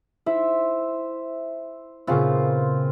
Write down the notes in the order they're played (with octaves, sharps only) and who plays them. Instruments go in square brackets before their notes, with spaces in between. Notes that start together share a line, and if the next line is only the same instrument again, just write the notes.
[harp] E4 [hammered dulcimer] C5 E5
[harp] A#2 C#3 B3 [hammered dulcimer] C4 F4 G#4